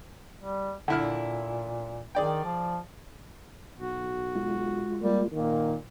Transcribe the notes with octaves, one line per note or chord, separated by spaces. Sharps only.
G3
A#2 D3 E4 F6
D#3 G#4 D5 G5
F3
B1 F#4
G#3 F4
G3 A#3
A#2 D#3 A#3